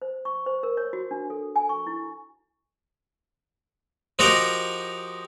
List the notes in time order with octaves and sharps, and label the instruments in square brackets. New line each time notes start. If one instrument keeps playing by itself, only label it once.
[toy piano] C5
C#6
C5
A#4
C#5
F#4
D4
A4
G#5
C#6
E4
[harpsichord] F3 D#4 F#4 G4 A#4